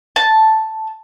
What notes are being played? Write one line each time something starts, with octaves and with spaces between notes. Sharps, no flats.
A5